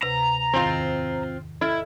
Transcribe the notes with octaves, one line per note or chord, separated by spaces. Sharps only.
D2 C3 B4 A#5
E2 G#2 D#3 C4 F4
E4 A4 E5 F6